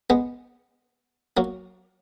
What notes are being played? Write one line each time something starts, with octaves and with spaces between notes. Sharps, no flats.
G#3 B3
F#3 A#3